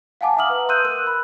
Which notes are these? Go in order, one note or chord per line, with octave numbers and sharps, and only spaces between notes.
F5 F#5 G#5 A5 D6
E5 F#5 A#5 D#6 F6 F#7
B4
C6 D#6 E6 F#6 G6 D#7
A#4 E6 F#6
B5